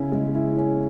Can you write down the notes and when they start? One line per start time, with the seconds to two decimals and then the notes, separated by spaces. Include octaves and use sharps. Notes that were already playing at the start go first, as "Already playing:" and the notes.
Already playing: C#3 C#4 E4
0.12 G#3
0.35 E4
0.57 C#4